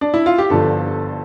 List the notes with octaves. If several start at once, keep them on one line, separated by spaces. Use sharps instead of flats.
D4
E4
F4
G4
G1 G2 D3 F3 A4